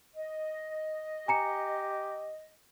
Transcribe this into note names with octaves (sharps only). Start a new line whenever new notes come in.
D#5
G4 G#5 A#5 C#7